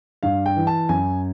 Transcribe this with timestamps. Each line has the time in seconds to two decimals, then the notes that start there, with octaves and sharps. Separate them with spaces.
0.23 G2 F5
0.46 G5
0.57 E3
0.67 A5
0.89 F#2 G#5